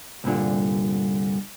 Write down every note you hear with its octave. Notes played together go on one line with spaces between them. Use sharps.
C2 G2 A#2 D3